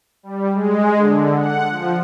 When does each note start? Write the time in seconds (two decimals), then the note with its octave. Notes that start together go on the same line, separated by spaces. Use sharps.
0.23 G3
0.54 G#3
0.96 D3
1.38 F#5
1.70 F3